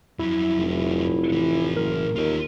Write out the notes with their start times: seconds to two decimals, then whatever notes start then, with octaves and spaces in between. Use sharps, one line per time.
0.19 F2 F#3 E4
0.58 F1
1.32 A2 E3
1.76 F#1 A#4
2.16 D#2 F4 D#5